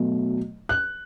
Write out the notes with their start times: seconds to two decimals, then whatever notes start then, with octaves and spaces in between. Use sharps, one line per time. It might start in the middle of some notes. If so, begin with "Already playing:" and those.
Already playing: B2 F#3 A3
0.69 F#6